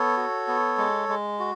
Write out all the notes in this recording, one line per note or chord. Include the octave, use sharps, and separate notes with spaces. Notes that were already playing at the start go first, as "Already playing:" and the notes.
Already playing: B3 A4 C#5
F#4
B3
G#3
G#3
F#4